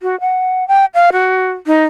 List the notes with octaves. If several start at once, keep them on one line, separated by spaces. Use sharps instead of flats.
F#4
F#5
G5
F5
F#4
D#4